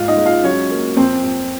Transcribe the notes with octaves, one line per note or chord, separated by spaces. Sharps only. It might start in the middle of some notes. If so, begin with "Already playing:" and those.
Already playing: G#2 F4 F5
D#4 D#5
G#3
F4 F5
F#3 C#4 C#5
A#3
F2 C4 C5
F2